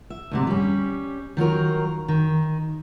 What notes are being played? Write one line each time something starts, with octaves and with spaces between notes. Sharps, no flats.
E5
D2 G#2 C3
G3 C#4
D#3 F#3 F4 A#4
D#3